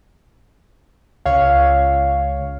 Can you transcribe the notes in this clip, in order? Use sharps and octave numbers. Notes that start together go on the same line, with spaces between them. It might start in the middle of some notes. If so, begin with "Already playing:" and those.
C#2 C#5 F5